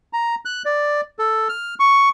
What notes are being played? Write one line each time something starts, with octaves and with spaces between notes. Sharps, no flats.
A#5
F#6
D5
A4
F6
C#6